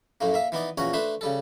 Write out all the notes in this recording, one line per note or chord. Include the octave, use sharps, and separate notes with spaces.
F#2 A2 A3 A#3
A#3 E5
E3 B3 D#4 D5
E2 A#2 C#4 F#4 A#5
A3 D4 B4 C5
C#3 G3 A4